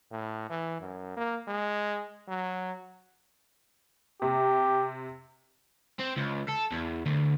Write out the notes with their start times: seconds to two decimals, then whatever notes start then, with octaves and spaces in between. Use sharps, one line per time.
0.11 A2
0.50 E3
0.80 F#2
1.17 A#3
1.48 G#3
2.28 F#3
4.22 C3 G4
6.00 C4
6.17 C#2
6.49 A4
6.72 E2
7.06 D2